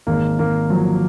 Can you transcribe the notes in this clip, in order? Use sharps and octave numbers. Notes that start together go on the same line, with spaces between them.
G#1 A#3
G#1 A#3
F3 F#3